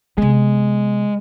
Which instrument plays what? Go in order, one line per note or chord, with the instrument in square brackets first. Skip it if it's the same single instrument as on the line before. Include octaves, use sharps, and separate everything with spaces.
[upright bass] C3 B3 [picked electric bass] G#3